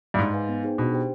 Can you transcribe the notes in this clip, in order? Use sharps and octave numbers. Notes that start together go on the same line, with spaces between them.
G2
G#2 D#4
B4 F5 G#5
B3
D#4 G#4 C5 G5
B2 D4
G4 C5 G5